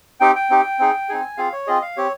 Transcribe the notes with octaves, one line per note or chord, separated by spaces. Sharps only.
C4 D#4 G4 G5
G5
C4 D#4 G4
C4 D#4 G#4
C4 D#4 G#4 G#5
C4 F4 G#4 F5
C#5
C4 F4 G#4 D#5
F5
C4 G4 C#5